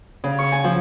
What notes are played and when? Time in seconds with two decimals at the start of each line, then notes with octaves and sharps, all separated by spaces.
0.24 C#3
0.39 C#6
0.52 G#5
0.64 F3